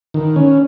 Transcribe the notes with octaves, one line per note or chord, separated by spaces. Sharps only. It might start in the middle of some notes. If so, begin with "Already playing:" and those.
D#3
C#4